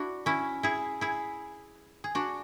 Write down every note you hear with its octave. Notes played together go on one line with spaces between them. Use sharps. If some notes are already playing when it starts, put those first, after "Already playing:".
Already playing: D4 E4 F#4
C#4 E4
E4 G#4
E4 G#4
G#4
D4 F#4